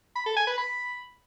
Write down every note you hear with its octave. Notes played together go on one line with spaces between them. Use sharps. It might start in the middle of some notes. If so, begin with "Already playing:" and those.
B5
A4
G#5
B4
B5